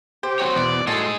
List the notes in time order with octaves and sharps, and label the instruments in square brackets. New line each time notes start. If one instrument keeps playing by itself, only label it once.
[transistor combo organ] G4 [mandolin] C5
[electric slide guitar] C4 F#4 C#5
[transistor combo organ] E2 B2 [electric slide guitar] D5
[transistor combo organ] A2 C6 [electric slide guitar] D#4 G#4 D#5 [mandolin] F#4 A5